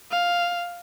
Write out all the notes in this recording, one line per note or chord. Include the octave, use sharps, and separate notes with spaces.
F5